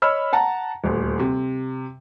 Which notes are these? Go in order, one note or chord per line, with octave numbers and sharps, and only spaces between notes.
C#5 D#5 B5 E6 F6
F#5 A5 A#5
D#1 D2
C3